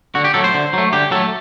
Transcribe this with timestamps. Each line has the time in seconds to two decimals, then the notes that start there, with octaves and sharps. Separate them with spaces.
0.15 D3 F#4
0.24 G4
0.34 F#3 A3 A4
0.44 C5
0.54 D3
0.73 F#3 A3
0.93 D3 G4
1.11 F#3 A3 A4